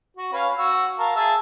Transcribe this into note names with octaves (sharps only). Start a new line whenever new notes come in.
F#4
C#4 B4 F5
F#4 F#5 E6
A#4 F5 A5
G#4 E5 A5